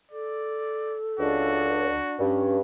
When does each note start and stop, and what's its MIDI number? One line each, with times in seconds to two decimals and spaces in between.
0.12 1.87 69
0.12 0.97 74
1.20 1.94 37
1.20 2.17 62
1.20 2.32 66
1.20 2.17 74
2.19 2.60 43
2.19 2.57 61